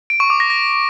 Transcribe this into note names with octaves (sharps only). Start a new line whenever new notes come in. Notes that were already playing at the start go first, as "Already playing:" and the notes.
D7
C#6
D6
A#6
A#6